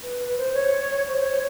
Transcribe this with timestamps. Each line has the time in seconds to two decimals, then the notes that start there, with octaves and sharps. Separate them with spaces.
0.03 B4
0.20 B4
0.37 C5
0.54 C#5
1.06 C5
1.23 C#5